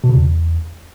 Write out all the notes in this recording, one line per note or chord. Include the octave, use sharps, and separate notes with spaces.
B2
C#3
E2